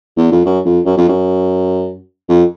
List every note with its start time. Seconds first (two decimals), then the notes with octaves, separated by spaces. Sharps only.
0.17 E2
0.32 F2
0.45 F#2
0.65 F2
0.85 F#2
0.97 F2
1.08 F#2
2.29 F2